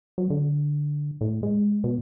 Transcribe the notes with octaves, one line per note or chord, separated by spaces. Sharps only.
F#3
D3
A2
G#3
B2